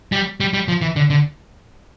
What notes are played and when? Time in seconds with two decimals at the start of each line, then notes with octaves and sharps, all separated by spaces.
0.12 G3
0.40 G3
0.54 G3
0.68 F3
0.81 E3
0.96 D3
1.10 D3